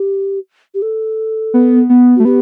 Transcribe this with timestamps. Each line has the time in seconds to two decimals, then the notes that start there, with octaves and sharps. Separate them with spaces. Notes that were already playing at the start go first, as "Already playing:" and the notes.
Already playing: G4
0.74 G4
0.82 A4
1.54 B3
1.89 B3
2.16 A3 F#4
2.25 B3 G4